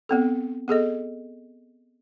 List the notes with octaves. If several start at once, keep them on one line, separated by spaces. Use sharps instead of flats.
B3 C4 A4
B3 G#4 A4 D#5